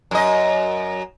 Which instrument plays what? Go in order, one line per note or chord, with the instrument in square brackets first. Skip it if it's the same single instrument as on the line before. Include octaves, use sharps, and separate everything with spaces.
[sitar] F#2 D#5